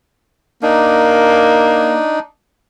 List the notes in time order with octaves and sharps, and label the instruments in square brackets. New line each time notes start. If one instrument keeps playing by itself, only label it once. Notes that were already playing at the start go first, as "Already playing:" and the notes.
[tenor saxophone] A#3 [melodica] D4 D#4